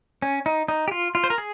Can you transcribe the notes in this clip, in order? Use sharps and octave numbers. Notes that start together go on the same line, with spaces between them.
C#4
D#4
D#4
G4
F4
F4
C5
A#4
G#4